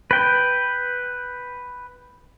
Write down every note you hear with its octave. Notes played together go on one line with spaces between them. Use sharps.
B4 G5